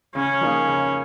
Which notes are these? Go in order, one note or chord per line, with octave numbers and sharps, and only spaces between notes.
C#3 C#4
F3 A#3 D#4 G#4
C#3